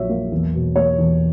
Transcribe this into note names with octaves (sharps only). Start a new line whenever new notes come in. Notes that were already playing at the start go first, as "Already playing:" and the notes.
Already playing: A#1 A#2 F#3 C#5 E5
A#3
E2
B2
A#3 C#5
E2